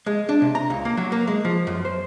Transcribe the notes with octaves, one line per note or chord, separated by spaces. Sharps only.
G#3
D4
C3
A#5
C#2
A#3
F#3
A#3
G#3
F3
F#2
C5